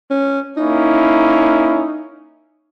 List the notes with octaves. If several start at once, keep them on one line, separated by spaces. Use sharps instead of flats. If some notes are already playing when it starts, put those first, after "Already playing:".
C#4
A#3 C#4 D#4 E4